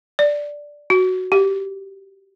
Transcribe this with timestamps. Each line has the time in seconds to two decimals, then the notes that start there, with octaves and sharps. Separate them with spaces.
0.19 D5
0.90 F#4
1.32 G4